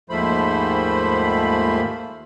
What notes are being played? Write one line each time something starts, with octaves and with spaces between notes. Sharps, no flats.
D#2 G#2 F3 A3 C5 B5